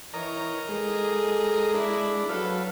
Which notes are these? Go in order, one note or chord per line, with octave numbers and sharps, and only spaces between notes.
E3 A#4 C#5 D#5 A#5
G#3 G#4 A4
D4 E4
F#3 A4 B4 F5